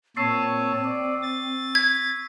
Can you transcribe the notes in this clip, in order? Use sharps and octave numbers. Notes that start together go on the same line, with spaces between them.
A#2 C4 C#5 A5 C#6 E6 C7
D5
A6
G#6 B6